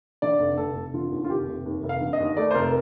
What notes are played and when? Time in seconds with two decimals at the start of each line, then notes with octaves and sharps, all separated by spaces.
0.22 D3 D5
0.40 F1
0.57 F1 A4
0.76 F1
0.94 D3 F4
1.12 D#2
1.25 F4
1.30 F1 G4
1.48 F1
1.65 D#2
1.83 F1
1.89 F5
2.01 D3
2.13 D#5
2.20 D#2
2.37 A3 D5
2.51 C5
2.55 F1 A#4